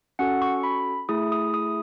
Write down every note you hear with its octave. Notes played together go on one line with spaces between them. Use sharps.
C#4 F#4 A4 F#5
C#6
B5
A3 E4 G#4 D#6
D#6
D#6